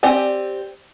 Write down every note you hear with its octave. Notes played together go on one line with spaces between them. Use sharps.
C4 G4 D5 G#5